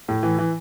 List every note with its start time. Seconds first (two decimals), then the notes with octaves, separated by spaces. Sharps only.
0.08 A2
0.23 E3
0.38 E3